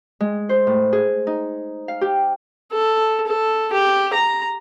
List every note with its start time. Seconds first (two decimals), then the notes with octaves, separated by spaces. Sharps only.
0.20 G#3
0.49 C5
0.67 A2
0.93 G#4
1.27 D#4
1.88 F5
2.01 G4
2.72 A4
3.26 A4
3.72 G4
4.13 A#5